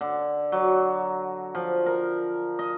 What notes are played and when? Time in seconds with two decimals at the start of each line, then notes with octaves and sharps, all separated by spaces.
0.01 D3
0.52 F#3
1.55 F3
1.86 A#4
2.59 D#5